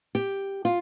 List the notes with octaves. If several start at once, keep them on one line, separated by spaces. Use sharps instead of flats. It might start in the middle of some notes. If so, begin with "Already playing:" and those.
G4
F4